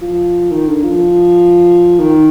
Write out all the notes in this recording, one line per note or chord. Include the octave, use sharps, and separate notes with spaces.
F3
D#3
D3
F3
D#3